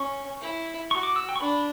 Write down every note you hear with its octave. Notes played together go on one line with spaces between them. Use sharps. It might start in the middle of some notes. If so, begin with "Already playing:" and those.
Already playing: C#4 C#6
E4
F#4 C#6
D6
E6
G5
C#6
D4 B5